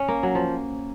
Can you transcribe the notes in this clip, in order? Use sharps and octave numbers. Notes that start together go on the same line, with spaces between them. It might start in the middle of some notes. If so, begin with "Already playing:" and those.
Already playing: C#4
A#3
F#3
F3